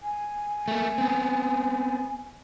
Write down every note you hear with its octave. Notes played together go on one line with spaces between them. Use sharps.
G#5
A3 A#3
B3 C4